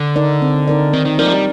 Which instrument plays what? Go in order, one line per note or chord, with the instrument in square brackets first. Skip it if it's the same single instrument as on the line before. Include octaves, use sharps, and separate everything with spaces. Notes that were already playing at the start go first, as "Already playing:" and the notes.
Already playing: [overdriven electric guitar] D3
[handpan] D#4 A#4 D5
C4
D#4 A#4 D5
[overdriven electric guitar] D#3 [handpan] C4
[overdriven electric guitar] D#3
[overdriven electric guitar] F3 [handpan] D#4 A#4 D5
[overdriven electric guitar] A3
G3